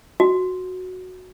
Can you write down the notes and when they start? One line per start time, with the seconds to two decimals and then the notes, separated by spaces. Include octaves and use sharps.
0.20 F#4